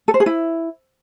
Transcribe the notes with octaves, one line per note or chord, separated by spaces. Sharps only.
A4
C5
G#4
E4